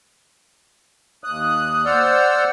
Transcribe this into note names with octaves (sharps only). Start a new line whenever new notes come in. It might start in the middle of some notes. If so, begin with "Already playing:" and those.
D#2 D#6 F#6
C5 D5 F#5 E6 F6 G6